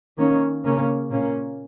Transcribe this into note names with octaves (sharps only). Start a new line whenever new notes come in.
D#3 A#3 C#4
C#3 A#3 C#4
A#2 A#3 C#4